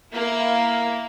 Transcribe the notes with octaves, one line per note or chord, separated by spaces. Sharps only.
A#3 E4